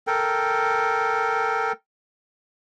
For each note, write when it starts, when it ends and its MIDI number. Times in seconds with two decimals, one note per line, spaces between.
0.07 1.72 69
0.07 1.72 70
0.07 1.72 79